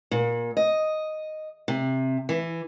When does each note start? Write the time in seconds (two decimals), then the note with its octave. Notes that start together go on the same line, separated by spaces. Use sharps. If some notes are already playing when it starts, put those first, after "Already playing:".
0.11 A#2
0.57 D#5
1.68 C3
2.29 E3